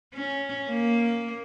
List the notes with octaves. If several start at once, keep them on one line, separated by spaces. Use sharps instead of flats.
C#4
A#3